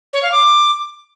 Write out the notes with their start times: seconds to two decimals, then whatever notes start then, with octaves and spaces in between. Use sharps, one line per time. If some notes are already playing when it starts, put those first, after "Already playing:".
0.13 C#5
0.23 F5
0.32 D6